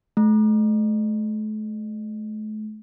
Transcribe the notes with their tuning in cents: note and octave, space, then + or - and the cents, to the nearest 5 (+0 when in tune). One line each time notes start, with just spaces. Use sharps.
A3 -40